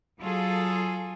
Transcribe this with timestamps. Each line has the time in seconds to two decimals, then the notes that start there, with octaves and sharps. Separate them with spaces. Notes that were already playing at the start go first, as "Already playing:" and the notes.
0.20 F#3 F4 G#4 A4